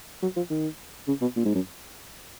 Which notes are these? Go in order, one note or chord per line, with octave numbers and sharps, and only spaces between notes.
F#3
F3
D#3
C#3
B2
A#2
G#2
F#2